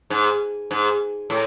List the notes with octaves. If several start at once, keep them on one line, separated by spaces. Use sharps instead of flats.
G#2
G#2
A2